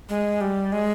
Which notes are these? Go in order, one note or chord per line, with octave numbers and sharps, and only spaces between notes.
G#3
G3
G#3